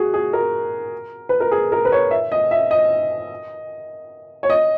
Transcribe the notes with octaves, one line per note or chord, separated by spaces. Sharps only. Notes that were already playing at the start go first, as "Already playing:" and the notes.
Already playing: F#4 G#4
G#4
A#4
B4
A#4
G#4
A#4
B4
C#5
E5
D#5
E5
D#5
C#5
D#5